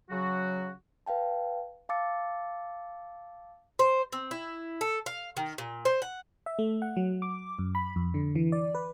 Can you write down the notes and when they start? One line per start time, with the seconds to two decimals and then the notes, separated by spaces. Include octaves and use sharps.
0.10 C#3 F#3 F#4
1.06 B4 F5 G5 A5
1.89 F5 A5 D6 E6 A6 C#7
3.79 C5
4.12 C4
4.31 E4
4.81 A4
5.06 F5
5.37 D#3
5.58 A#2
5.85 C5
6.02 F#5
6.46 E5
6.59 A3
6.82 F#5
6.96 F#3
7.22 D6
7.59 F#2
7.75 B5
7.96 F2
8.14 D3
8.35 E3
8.52 D5
8.74 B4